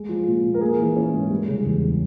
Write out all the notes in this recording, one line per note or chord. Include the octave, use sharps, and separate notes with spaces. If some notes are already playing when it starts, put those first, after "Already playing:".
Already playing: G#3
F3
A#2
A#2
A#4
A#3 G#4
E3
C#4
G#2
G3
C#3
E2